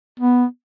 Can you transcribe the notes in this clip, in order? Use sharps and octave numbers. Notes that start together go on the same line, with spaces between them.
B3